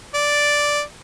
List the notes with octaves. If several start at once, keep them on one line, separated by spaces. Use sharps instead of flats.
D5